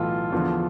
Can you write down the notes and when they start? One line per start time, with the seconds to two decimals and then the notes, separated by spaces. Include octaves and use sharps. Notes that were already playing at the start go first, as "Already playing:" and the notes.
Already playing: B1 A2 E3 F4 A4
0.32 E2 D3 F3